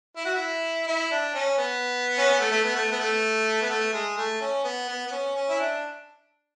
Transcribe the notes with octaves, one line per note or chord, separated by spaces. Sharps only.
E4
F#4
E4
E4
D4
C#4
B3
C#4
B3
A3
A3
B3
A3
B3
A3
B3
A3
G#3
A3
C#4
B3
B3
B3
C#4
C#4
E4
D4